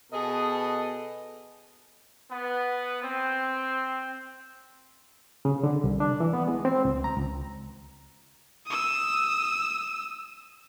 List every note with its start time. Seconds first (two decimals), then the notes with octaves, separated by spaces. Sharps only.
0.11 B2 B3 G#4 A4 D#5
2.29 B3
3.02 C4
5.45 C#3
5.63 D3
5.84 C2
6.00 D4
6.20 E3
6.33 B3
6.48 G#3
6.65 C4
6.85 C#2
7.04 A#5
7.17 C#2
8.66 D#6 E6